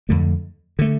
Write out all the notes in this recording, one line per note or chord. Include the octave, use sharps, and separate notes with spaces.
F2 D3 A3
D3 A3